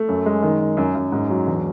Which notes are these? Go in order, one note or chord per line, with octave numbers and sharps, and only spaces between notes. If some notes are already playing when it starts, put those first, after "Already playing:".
Already playing: A3
F#2
G#3
D#3
D#3
F#2
F#2
G#2
F#3
E1